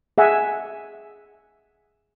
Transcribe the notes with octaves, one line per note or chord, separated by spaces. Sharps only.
G#4 E5 F#5 G#5